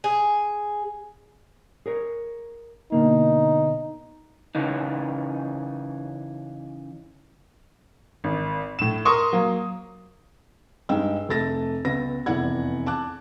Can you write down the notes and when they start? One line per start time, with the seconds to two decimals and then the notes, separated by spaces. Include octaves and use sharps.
0.04 G#4
1.86 G#4 A#4 C#5
2.92 B2 D3 A#3 D#4
4.55 C#3 E3 D#4
8.24 G#1
8.79 A2 E7
9.05 A#4 C6 C#6 D#6
9.32 F#3 A#3
10.89 G2 G#3 D#4 G5 E6
11.29 F1 A3 A6 A#6
11.85 C#2 B3 A#6
12.26 F1 E2 E4 D5 F#5 G#6
12.86 A5 D6 F#6